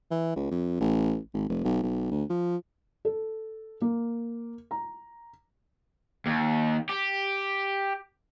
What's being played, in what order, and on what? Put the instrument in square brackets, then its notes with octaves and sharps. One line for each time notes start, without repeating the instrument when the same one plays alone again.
[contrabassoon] E3
C#2
F2
A1
G#1
F1
B1
B1
D2
F3
[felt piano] A4
A#3
A#5
[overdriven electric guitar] D#2
G4